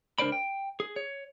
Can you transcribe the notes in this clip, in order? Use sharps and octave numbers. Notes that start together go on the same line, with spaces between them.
C#2 D4 A#4 C5 D5 B5
G5
G#4
C#5